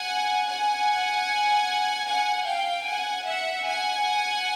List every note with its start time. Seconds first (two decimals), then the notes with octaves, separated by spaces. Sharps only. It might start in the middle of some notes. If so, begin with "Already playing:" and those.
Already playing: F#5 G#5
0.47 F#5 G#5
2.07 F#5 G#5
2.47 F5 G5
2.87 F#5 G#5
3.27 E5 F#5
3.66 F#5 G#5